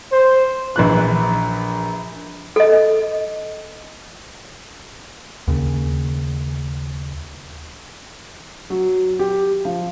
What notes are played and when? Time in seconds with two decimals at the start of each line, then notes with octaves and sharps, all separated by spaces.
0.12 C5
0.76 A#1 E3 F#6
2.56 A4 D#5
5.48 D#2 C#3
8.70 F#3
9.19 G4
9.65 F3